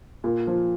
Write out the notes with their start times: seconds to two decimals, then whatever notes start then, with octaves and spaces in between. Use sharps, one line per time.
0.24 A#2
0.47 F3